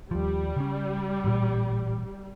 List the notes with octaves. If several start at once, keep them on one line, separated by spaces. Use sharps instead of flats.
D#2 F3 G3
C#3 C#4
A1 A#2